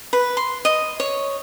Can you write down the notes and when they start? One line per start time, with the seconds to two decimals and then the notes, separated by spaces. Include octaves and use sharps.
0.13 B4
0.37 C6
0.65 D#5
1.00 C#5